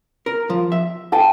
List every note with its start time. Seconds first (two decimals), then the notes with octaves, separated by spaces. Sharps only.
0.26 A#4
0.50 F3
0.72 E5
1.12 G5 A5